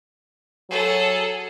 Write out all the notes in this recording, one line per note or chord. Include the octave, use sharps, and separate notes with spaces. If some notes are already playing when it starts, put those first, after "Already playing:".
F#3 G#4 A4